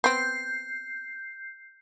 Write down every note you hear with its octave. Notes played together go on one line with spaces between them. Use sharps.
B3 C4 G6 C7